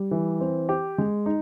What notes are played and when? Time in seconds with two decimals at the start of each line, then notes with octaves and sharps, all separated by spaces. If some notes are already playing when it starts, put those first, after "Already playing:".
Already playing: G3
0.11 E3
0.40 C4
0.69 G4
0.98 G#3
1.26 D#4